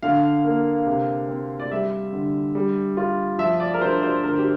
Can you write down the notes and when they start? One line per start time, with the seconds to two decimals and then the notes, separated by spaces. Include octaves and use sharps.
0.03 D3 F5
0.44 A#3
0.86 C3
1.28 C4
1.60 D5
1.71 G3 E5
2.13 D3
2.55 G3
2.97 F4
3.39 F3 E5
3.60 D5
3.74 A#4
3.81 D4 C5
4.03 C5
4.23 D3 A#4
4.38 G4